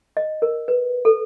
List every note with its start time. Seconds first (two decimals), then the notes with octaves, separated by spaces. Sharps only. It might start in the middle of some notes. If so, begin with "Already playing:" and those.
0.17 D#5
0.42 A#4
0.68 B4
1.05 A4